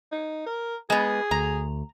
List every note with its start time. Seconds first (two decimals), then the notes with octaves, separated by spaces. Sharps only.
0.12 D#4
0.46 A#4
0.90 G#3 B3 G#4
1.31 D2 A#5